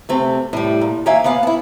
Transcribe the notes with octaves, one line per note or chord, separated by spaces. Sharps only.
C3 A3 C4
A2 G3
A#2
D#2 A#3 E5 F5 G#5
A#3 B3 F5 F#5
E4 A5